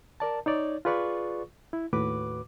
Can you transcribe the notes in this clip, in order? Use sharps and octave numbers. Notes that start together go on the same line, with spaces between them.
A#4 D5 A5
D#4 C#5 D5
F4 G#4 B4 D5 C#6
E4
D#2 A2 F#4 B4 D6